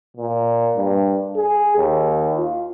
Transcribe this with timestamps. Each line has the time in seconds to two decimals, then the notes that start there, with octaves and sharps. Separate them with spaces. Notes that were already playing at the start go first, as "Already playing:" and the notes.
0.17 A#2
0.76 G2
1.36 G#4
1.77 D#2
2.37 F4